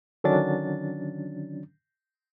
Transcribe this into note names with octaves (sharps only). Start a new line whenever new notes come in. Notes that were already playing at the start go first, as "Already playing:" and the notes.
D3 D#3 F#3 C#4 D4 A6